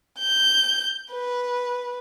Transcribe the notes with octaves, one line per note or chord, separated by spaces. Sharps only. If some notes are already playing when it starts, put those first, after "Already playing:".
G6
B4